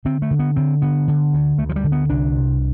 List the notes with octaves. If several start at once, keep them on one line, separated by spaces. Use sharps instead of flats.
D3 C4
A3
D3
B3
D3 C4
D3 B3
D3
D2
D2 A3
F3
G3
D3
B3
C2 D4
C3